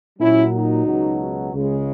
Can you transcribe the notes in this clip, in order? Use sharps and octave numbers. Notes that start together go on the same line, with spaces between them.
A#2 F#3 C#4 E4
D#4 F#4
C#2 B2 F#3
C#2 C#3 G#3